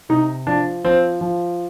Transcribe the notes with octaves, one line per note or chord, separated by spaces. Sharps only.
C3 D#4
F3 D4
F3 C4
F3